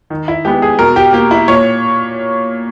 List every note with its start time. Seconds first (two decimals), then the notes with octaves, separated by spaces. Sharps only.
0.10 D#3
0.28 E4
0.45 G#3 B3 G4
0.62 G#4
0.79 B2 A#4
0.96 G4
1.13 A#3 G4
1.31 E4
1.48 A#2 C#5